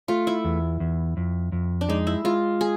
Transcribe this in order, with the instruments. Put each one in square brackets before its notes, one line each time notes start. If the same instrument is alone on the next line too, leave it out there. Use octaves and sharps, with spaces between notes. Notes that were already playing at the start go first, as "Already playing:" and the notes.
[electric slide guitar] A3 [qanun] F4
[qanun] E4
[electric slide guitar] E2
E2
F2
F2
[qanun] D4
[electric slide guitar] G#3 [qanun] D#4
[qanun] E4
[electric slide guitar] G#3 [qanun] F4
[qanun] G#4